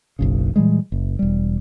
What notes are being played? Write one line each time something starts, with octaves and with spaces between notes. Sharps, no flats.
F#1 B1 C#3
A#2 E3 G3 G#3
F#1
E1 G3